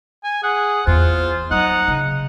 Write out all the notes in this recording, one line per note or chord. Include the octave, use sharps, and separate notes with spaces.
G#5
G#4 F#5
E2 F4 C5
F#3 D#4 F#5
C#3